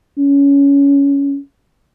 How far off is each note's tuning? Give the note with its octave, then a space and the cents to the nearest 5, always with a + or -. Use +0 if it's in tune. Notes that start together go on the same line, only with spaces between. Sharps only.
C#4 +15